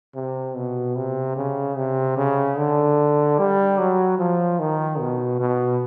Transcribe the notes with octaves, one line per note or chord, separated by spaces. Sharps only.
C3
B2
C3
C#3
C3
C#3
D3
G3
F#3
F3
D#3
B2
B2